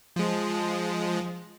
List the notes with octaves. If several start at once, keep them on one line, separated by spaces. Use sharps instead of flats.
F3 G#3